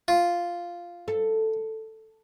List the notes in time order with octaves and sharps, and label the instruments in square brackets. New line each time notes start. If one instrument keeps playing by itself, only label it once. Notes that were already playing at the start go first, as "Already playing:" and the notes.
[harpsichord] F4
[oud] A4